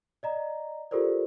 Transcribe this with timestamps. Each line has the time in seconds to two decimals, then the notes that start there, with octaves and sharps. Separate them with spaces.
0.23 D5 D#5 A#5
0.91 F4 G4 A4 A#4 C5 D5